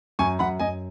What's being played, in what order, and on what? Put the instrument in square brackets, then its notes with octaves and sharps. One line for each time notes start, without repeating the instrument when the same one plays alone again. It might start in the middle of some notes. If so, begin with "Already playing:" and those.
[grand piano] F#2 G#5 C#6
F#2 F#5 B5
F#2 D#5 G#5